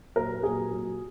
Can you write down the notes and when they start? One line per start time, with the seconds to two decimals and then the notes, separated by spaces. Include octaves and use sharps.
0.16 A#2 F#3 A#4
0.43 A#2 F#3 G#4
0.71 A#2 F#3